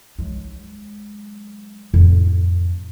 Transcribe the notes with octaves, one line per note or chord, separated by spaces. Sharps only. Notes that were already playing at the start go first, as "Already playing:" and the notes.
F#3 G#3
F2 A2